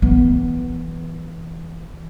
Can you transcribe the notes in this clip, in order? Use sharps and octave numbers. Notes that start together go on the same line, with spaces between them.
E3 B3